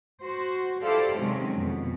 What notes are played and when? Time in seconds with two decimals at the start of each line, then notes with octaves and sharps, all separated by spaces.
0.24 F#4 C5
0.83 E4 G4 A4 C5 D5 F5
1.18 C3 D#3 F#3 G#3 C4 C#4
1.54 F2 B2